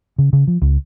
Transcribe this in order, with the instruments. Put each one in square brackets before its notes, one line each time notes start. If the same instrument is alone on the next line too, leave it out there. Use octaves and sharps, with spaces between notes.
[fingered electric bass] C#3
C#3
F3
C#2